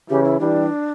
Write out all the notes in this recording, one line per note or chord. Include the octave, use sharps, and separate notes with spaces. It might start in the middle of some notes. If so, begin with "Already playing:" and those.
C#3 E3 G4
E4
E3 G3 D4